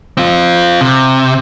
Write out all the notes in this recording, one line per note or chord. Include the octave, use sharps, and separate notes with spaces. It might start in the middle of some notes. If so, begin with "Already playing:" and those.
C4 F4
C3